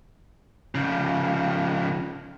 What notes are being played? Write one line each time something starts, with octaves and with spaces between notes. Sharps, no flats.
C#3 F3